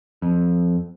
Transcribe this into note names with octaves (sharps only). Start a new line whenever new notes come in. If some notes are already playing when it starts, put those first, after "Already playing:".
F2